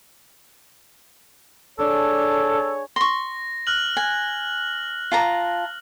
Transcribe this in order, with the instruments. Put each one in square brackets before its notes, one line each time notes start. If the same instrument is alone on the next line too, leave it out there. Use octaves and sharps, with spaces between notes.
[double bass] D4 [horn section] G#4 C#5 [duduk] A4
[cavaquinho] C6 C#6 [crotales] A#6
[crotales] F6 F#6 F#7
[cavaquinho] G#5
F4 A5 A#5